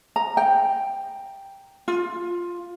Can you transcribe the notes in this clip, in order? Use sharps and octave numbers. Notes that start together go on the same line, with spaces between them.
A#5
G5
F4